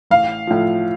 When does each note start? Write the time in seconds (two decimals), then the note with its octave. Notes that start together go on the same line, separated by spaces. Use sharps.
0.11 A1 F5
0.47 A2 F3